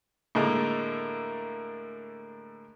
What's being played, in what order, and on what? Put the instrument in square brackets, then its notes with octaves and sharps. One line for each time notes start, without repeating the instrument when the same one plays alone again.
[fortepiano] A2 D3 G#3 A#3